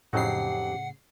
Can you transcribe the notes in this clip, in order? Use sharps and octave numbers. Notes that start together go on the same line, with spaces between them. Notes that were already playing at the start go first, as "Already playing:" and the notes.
F2 A2 C#3 F#3 D#4 G4 F#5 C7